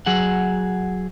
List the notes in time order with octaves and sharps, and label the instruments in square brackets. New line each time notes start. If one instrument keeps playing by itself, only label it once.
[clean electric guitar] F#3 G#4 F#5